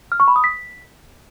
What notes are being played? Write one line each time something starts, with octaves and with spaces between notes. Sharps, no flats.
F6
C#6
B5
D#6
B6